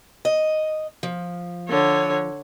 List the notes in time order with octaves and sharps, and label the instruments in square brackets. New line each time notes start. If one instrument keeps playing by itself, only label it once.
[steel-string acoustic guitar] D#5
F3
[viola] D3 C#5